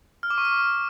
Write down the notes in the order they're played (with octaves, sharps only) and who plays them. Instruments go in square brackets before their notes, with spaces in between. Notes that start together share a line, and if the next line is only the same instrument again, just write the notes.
[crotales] F6
D6
C#6
F6